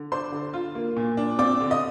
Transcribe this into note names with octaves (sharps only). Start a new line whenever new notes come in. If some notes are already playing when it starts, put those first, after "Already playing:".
Already playing: D3
D4 C5 C6
D3
F4
A#3
A#2
D4
C4 D5 D6
D3
D#5 D#6